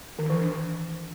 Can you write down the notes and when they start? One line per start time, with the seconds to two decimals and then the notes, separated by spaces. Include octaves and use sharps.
0.19 D#3
0.30 E3
0.41 D4
0.52 E3